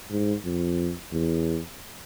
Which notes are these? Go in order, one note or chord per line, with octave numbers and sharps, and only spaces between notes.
G#2
F2
E2